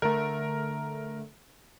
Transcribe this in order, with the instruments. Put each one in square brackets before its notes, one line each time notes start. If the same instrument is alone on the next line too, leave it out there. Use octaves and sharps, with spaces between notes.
[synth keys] D3 A3 [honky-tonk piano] A#4